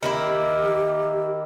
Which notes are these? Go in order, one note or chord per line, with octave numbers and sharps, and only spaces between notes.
D#3 A#3 E4 G4